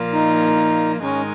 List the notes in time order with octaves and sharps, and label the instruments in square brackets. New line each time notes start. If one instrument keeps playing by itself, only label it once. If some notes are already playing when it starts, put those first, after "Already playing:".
Already playing: [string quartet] A#2 F3 A#3 F4
[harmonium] D#4
[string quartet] G#2 D#3 G#3 D#4 A#4 [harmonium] C#4